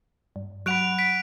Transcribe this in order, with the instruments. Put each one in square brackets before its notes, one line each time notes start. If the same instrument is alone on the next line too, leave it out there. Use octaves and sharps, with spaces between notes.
[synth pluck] G2
[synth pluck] F#3 F#5 B5 [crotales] F#6 D7 F7
[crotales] B6 D7